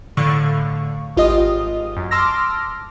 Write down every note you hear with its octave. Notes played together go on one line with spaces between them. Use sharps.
A2 D3 F5 C#6
G#1 F4 G4 D#5 D#6
F#2
A5 C6 D6 E6 F6 A#6